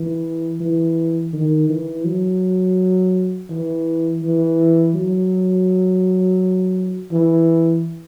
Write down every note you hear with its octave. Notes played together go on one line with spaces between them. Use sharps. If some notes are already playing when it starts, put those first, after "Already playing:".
Already playing: E3
E3
D#3
E3
F#3
E3
E3
F#3
E3